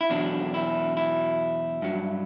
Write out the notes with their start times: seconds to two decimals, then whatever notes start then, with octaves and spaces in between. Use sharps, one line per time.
0.01 E4
0.10 E2 B2 F#3 D4
0.54 E4
0.97 E4
1.82 G2 F#3